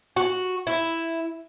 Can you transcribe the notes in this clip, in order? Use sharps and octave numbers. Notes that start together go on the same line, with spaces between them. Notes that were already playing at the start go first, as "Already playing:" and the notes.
F#4
E4